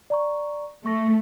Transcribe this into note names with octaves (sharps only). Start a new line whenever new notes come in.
D5 A#5 C#6
A3 C#6 A#6